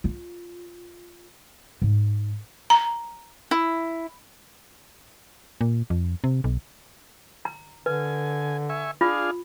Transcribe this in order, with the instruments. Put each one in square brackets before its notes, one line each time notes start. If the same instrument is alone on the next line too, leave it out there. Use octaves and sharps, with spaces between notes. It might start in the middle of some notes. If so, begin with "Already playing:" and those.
[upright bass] F4
G#2
[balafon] A#5
[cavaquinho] E4
[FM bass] A#2
F2
C3
B1
[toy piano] A#5
[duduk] D3 [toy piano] B4 [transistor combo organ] G#5
[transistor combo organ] E5 G#5 C#6
[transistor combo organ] D4 G#4 F5 [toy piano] F4